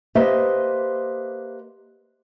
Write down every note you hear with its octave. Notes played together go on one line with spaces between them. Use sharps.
A#3 G4 B4 C5 D#5 E5